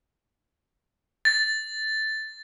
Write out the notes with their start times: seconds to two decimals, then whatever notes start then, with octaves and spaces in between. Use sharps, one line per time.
1.25 A6